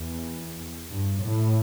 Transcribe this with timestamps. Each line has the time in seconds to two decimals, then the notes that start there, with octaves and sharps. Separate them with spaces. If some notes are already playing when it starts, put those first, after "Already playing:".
Already playing: E2
0.90 G2
1.23 A2